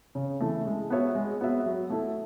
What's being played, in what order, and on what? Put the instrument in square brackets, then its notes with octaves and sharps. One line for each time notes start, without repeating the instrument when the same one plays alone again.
[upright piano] C#3
E3 A3
G#3
B3 F#4 C#5 E5
G#3
B3 F#4 C#5 E5
F#3
A3 E4 A4